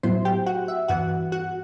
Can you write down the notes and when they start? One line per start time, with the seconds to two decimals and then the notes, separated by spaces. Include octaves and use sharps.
0.03 A2 F#3 B3 E4 C5 C6
0.25 G4 G5
0.46 F#4 F#5
0.68 E5
0.88 G2 E3 B3 F#4 F#5
1.32 F#4 F#5